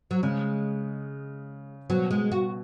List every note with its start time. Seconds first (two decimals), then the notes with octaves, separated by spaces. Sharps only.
0.11 F#3
0.23 C#3 G#3
1.90 B2 F#3
2.11 G#3
2.32 F#4